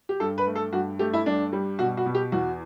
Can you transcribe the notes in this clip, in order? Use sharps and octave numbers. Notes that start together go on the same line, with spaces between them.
G4
G2 A4
B4
A3
A4
G2 F#4
A3 G4
E4
G2 D4
G3
B2 F#4
F#4
B2
G4
E2 F#4